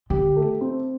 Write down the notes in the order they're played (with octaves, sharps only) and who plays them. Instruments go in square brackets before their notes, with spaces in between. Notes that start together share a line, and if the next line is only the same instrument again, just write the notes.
[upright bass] D3 [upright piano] G4
[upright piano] A3
C4